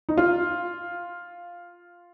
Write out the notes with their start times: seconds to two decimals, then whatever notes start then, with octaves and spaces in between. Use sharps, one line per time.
0.09 D#4
0.17 F4